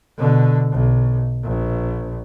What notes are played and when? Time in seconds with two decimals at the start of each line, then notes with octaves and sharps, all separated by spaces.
0.18 B2 D3
0.72 B1
1.44 A#1